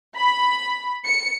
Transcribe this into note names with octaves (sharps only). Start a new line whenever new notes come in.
B5
C#7